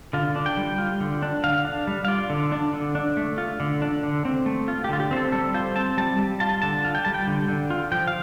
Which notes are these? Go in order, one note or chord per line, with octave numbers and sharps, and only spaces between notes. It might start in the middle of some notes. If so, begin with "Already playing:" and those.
D3 F4
D4
G5
G3
F4
D3
D4
D3 F5
D4
G3
F5
F4 D5
D3
D4
D3
D4
A3
F4
D3
D4
D3
C4
A3
F4
G4
D3 F4
G4
C4 C5
A4
G3 A4
F4 C5
C4 A5
G3 A5
G3
F4 A5
D3 A5
F4
G5
G3 A5
G5
D3
D3
F4
F3 G5
F5